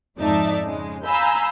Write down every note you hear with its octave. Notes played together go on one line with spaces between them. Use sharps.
F2 G#2 D#4 D5 E5 A5
C#3 G#3
F5 G#5 A#5 B5 E6 G6